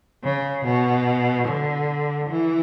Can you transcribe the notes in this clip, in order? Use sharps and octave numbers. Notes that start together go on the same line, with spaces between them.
C#3
B2
D3
E3